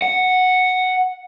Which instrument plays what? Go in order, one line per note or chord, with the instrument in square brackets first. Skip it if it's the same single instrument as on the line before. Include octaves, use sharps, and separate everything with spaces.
[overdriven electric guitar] F#5